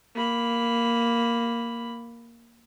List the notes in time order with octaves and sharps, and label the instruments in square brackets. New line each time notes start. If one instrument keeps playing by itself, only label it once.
[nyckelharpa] A#3 B5